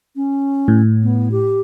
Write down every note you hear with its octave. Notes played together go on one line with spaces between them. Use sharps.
C#4
A2
B3
G4